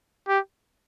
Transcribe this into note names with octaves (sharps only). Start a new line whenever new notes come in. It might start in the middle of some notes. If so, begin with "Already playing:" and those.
G4